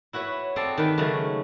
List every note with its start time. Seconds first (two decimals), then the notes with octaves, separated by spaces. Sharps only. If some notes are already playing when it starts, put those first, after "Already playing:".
0.13 E4 F#4 B4 C#5
0.56 C4 G#4 A4 D5 A#5 C6
0.78 D#3 B4
0.98 C#3 F#3 G#3 A3